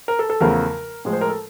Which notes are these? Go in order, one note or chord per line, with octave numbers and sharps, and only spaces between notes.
A#4
A4
A4
E2 C#3 F3 A3 A#4
A2 F3 G#3
C5
A#4
A4